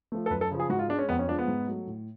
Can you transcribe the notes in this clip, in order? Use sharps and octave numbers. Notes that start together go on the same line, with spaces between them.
F3 A3
A4
F#2 B4
A4
C#3 F3
G#4
G#2 F#4
F4
G#3 D4
C#4
F2 B3
C#4
F3 G#3 D4
B3
G#2
F#3 A3
A2